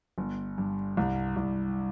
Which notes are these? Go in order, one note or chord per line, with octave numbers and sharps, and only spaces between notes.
G1
G2
C2
C2